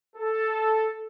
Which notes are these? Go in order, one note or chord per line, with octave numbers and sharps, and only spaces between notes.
A4